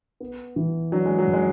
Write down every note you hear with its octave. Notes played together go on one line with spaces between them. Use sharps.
B3
E3
F#3 D4
G#3
F#3
F#2
G#3